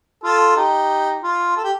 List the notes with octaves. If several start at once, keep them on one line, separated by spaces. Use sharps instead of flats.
F4 A4
D#4 G4
F4
A4
G4